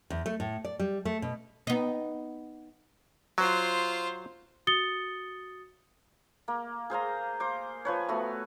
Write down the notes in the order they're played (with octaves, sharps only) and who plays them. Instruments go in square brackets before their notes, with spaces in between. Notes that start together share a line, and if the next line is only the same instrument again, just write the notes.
[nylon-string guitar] E2
A3
A2
D5
G3
A3
B2
[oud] B3 D#4
[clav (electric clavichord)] F#3 [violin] F4 C5
[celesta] F#4 D#6 A6 C#7 G7
[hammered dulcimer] A#3
G#4 C5 F5 A#5
C5 D6
F3 B4 C#5
A3 B3 F#4